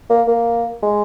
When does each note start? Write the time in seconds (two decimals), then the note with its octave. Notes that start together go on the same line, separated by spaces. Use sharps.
0.10 A#3
0.28 A#3
0.83 G#3